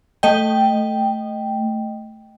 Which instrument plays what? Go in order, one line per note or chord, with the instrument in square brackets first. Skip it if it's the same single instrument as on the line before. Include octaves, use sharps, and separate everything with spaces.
[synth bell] A3 D#5 G5